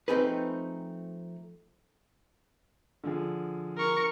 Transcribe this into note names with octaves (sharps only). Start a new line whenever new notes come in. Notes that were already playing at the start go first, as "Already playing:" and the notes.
F3 A3 C4 D#4 G#4 B4
D3 F3 G#4
A#4 C#6